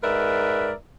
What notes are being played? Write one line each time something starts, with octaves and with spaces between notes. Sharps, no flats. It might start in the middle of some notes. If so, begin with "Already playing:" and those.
G#2 A#4 B4 D5 E5